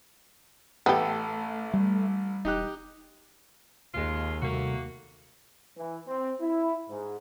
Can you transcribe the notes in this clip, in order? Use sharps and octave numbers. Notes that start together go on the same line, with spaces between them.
A1 A3 B3 G4 A4 B4
G3
E1 D#4 G4 F#6
D#2 G#3 F4
C3 G3 A3 A#3 F#4
E3
C4
E4
G#2